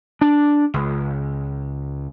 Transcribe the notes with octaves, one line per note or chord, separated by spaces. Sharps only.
D4
C#2